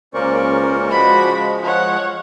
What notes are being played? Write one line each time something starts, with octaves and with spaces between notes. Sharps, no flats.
C#2 A#3 C#4 A#4 C5 D5 C#6
F3 G#3 F#4 B5
F4 C#5 F#5